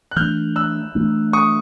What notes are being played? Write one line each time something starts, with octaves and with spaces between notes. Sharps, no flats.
F#6
E3 A3 D4 F6 G6
E6 F#6
E3 A3 D4
C#6 D#6